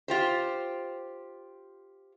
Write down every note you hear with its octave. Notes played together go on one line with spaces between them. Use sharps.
F4 G4 C5